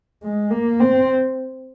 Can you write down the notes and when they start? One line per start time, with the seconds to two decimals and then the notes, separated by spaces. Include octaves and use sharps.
0.23 G#3
0.51 A#3
0.80 C4